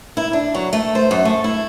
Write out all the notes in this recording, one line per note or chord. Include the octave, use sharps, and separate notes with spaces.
E4
D4
F#3
A3
C5
F#2
A3
E4